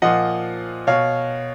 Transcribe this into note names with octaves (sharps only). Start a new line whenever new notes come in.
A#2 F3 D#5 F#5
B2 C#5 F5